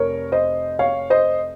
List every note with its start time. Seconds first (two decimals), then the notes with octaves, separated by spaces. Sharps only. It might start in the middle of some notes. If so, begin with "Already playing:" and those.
Already playing: F1 A#4 C#5
0.32 C5 D#5
0.79 C#5 F5
1.10 C5 D#5